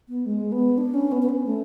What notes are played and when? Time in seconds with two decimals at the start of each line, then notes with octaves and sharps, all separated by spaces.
0.09 B3
0.26 G#3
0.52 B3
0.78 D4
0.94 C#4
1.12 B3
1.22 B3
1.29 C#4
1.46 A3